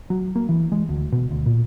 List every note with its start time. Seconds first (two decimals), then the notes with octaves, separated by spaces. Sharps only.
0.10 F#3
0.36 A#3
0.49 E3
0.72 G#3
0.89 D2
1.12 B2
1.31 D2
1.46 A#2